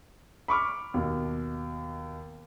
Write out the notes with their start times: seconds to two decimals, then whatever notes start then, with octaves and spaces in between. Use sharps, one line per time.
0.48 B5 C#6 D6 F6
0.94 D#2 B2